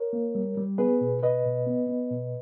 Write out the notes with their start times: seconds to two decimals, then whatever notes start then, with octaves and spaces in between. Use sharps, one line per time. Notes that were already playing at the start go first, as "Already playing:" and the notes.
Already playing: A#4 C#5
0.13 A#3
0.35 G3
0.57 G3
0.78 B3 G#4 B4
1.01 B2
1.23 B2 B4 D#5
1.45 B2
1.67 B3
1.89 B3
2.11 B2